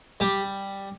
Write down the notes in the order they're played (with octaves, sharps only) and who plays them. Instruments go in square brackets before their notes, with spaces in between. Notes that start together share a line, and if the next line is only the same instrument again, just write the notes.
[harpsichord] G3 G4